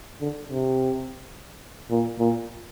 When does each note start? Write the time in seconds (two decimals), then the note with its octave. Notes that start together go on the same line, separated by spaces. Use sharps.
0.21 D3
0.49 C3
1.90 A#2
2.19 A#2